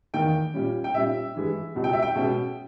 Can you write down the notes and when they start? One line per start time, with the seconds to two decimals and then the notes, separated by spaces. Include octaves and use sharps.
0.14 E2 D#3 A#3 G5
0.54 A#2 G3 C#4
0.84 G5
0.94 A#2 G3 C#4 E5
1.34 G2 E3 G#3
1.75 C#2 B2 G3
1.84 G5
1.93 E5
2.02 G5
2.15 B2 G#3 C#4